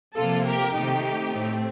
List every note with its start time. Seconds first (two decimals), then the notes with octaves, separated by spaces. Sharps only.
0.17 C3 F3 A#3 F4 A4
0.46 G4 A#4
0.74 C3 D#3 A3 D#4 G4
1.32 A2 A3 C4